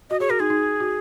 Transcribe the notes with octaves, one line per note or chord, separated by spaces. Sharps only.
F#4 D#5
G#4 C#5
F#4 A#4
D#4 G#4
D#4
F#4